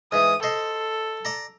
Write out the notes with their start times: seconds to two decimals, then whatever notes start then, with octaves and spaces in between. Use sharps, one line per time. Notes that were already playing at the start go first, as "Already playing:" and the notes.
0.12 G#2 E3 D#6
0.43 A4 C5 D#5 C6
1.25 D5 A#5